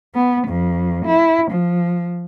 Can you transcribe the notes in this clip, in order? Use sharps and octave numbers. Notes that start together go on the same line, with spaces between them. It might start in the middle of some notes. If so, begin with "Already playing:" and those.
B3
F2
E4
F3